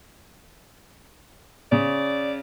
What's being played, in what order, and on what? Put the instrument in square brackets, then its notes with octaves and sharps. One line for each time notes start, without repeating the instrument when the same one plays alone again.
[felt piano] C#3 [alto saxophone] D5